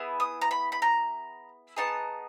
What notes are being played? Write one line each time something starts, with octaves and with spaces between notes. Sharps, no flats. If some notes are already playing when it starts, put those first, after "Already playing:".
Already playing: B3 E4 G#4
D#6
A#5
B5
B5
A#5
B3 D#4 G#4 A5